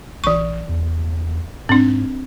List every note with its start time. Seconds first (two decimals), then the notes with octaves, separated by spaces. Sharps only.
0.24 A#1 E3 C#6
0.69 E2
1.69 G#2 C4 D4